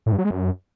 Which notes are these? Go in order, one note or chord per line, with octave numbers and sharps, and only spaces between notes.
A2
G2
F#3
G#3
F#2